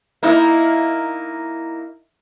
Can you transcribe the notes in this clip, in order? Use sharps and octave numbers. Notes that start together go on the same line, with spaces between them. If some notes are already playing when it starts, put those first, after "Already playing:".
A#3 D#4 E4